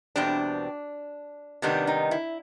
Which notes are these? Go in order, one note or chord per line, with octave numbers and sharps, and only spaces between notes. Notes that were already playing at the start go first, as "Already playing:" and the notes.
E2 B2 G3 C4 D4
C3 D#3 G3 B3 D4
D#4
E4